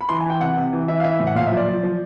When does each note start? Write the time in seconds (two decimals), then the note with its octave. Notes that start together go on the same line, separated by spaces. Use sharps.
0.01 B5
0.09 E3 C6
0.20 G#5
0.26 E3 G5
0.40 C3 F#5
0.57 C3
0.73 E3
0.88 E3 E5
1.00 F5
1.04 E3 E5
1.20 A2
1.27 F#5
1.35 A#2 F5
1.46 E5
1.52 F3
1.57 D5
1.68 F3
1.83 F3